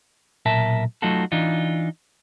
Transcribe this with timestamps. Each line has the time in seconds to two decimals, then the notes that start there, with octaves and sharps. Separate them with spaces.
0.46 B1 A#2 A#4 E5 A5
1.02 F#3 A3 D#4 F4 F#4 A4
1.32 E3 D4 D#4 F4